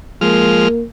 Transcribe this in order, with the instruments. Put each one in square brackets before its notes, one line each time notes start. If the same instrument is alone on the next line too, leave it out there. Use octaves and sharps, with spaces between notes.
[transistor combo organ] F3 G#3 F6 [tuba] A#3